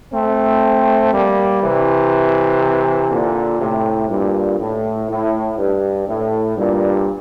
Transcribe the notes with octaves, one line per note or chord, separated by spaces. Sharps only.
A3 C4
G3 A#3
C3 E3
A#2 D3
A2 C3
G2 A#2
A2
A2
G2
A2
G2 A#2